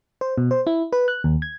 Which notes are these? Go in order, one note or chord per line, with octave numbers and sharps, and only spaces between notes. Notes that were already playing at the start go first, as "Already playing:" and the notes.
C5
B2
C5
E4
B4
F#6
D#2
G#6